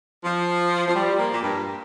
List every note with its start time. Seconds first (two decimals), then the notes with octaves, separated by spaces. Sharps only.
0.24 F3
0.88 F3
0.95 G3
1.18 A#3
1.33 A#2
1.43 G2